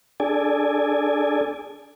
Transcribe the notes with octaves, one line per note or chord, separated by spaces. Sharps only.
D4 G#4 A4 D5 G#5